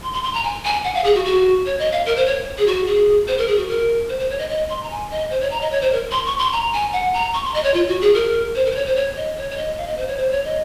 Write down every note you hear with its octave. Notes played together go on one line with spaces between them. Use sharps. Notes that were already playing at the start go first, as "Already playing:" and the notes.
C6
C6
C6
A#5
G#5
G#5
F#5
F5
G#4
F#4
F#4
C#5
D#5
F5
A#4
C5
C#5
G#4
F#4
G#4
C5
A#4
G#4
F#4
A#4
C5
C5
C#5
D#5
D#5
C6
A#5
G#5
D#5
C5
C#5
A#5
D#5
C#5
C5
A#4
C6
C#6
C6
A#5
G#5
F#5
A#5
C#6
C6
D#5
C#5
F4
F#4
G#4
A#4
C5
A#4
C5
C#5
C5
C#5
D#5
C#5
C#5
D#5
F5
D#5
C5
C#5
C5
C#5
D#5